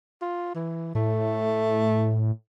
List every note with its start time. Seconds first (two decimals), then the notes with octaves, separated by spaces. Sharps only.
0.21 F4
0.55 E3
0.95 A2 A3